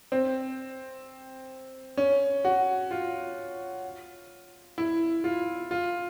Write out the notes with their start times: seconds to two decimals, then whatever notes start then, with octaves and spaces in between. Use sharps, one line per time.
0.12 C4
1.97 C#4
2.45 F#4
2.91 F4
4.78 E4
5.24 F4
5.71 F4